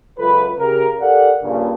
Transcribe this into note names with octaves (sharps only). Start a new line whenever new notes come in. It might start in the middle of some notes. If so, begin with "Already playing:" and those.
C#2 F#2 F4 A4 B4
C#3 G4 A#4
G4 A4 A#4 D5 F5 F#5
G2 A#2 C#3